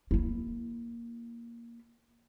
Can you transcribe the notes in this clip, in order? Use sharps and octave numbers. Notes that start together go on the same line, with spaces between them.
A#3 E4